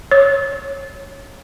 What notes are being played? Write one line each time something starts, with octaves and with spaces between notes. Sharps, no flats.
C#5